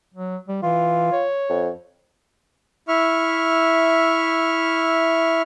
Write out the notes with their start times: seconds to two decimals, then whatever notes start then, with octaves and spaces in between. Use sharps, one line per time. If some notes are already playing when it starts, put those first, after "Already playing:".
0.14 F#3
0.48 G3
0.63 E3 F4
1.12 C#5
1.49 F2
2.88 E4 E5 C#6 F6